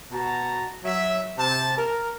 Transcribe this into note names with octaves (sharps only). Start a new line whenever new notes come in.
B2 F#4 A5 A#5
F#3 E5
C3 A5
A#4